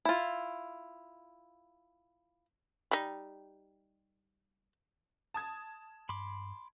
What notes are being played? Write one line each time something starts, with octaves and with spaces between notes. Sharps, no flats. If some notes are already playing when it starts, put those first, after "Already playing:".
E4 F4
G3 D#4
A5 D#6 G#6
G2 B5 C6 D6